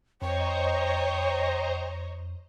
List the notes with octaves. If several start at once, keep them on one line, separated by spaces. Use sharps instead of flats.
F2 C5 C#5 D#5 G5 A#5